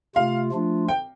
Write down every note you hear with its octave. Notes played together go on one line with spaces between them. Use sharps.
C3 A3 F4 F5
F3 A3 D4 F4
G5